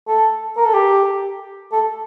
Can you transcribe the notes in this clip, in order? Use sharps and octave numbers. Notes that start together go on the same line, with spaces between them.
A4
A#4
A4
G4
A4